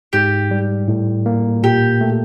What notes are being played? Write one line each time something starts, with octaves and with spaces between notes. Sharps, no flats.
G#2 G4
G3
A2
A#3
A#2 G4
A3